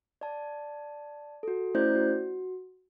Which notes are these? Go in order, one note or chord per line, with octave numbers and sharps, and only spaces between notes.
D5 A5
F#4 A4
A3 C#4 E4 C5 D5 G6
F#4